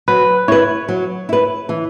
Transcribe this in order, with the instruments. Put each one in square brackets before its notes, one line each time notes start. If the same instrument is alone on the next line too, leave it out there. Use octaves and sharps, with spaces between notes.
[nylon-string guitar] F#3 [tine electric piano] B4
[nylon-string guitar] E4 B4 [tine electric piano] C#5
[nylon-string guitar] F#3
E4 B4
E3